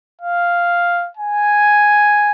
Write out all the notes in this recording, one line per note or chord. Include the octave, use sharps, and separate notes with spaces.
F5
G#5